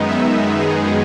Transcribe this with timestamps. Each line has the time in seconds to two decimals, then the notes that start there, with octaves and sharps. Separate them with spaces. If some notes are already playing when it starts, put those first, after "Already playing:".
Already playing: F#2 D#3 G#3 B3 D#4
0.09 E5
0.60 G#4